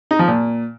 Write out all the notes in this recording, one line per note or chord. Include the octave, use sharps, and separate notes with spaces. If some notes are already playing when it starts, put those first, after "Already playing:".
D#4
F3
A#2